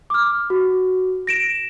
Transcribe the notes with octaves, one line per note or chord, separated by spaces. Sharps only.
D6 F6
F#4
A#6 D7 E7